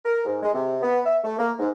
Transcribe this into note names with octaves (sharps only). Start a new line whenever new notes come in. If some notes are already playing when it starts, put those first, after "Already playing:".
A#4
G#2
G#3
C3
B3
E5
A3
A#3
G#2